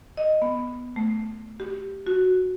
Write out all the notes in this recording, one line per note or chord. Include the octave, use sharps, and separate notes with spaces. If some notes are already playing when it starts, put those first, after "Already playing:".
D#5
B3
A3
G4
F#4